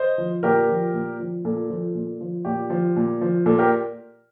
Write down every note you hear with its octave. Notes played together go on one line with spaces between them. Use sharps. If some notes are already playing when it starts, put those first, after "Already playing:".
Already playing: C5 D#5
F3
A#2 G4 A#4
F3
A#2
F3
A#2 A4
F3
A#2
F3
A#2 G4
F3
A#2
F3
A#2 A4
G4 A#4